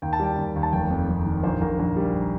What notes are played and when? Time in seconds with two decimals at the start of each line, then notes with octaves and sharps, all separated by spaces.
0.02 D#2 G5
0.13 A5
0.20 G3 G5
0.38 D#2
0.56 D#2
0.63 A5
0.73 F1 G5
0.90 F2
1.09 F2
1.26 D#3
1.43 A#1 C5
1.61 A#1 A#4
1.79 A#1 A#4
1.97 G3